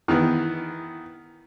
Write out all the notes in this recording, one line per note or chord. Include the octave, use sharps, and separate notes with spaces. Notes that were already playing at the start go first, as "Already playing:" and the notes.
D#3 E3 B3